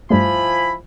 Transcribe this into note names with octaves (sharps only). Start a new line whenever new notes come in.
G2 F3 G3 A3 E4 G#5 B5